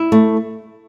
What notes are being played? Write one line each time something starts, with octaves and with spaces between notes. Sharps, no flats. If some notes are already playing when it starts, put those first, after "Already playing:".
Already playing: E4
A3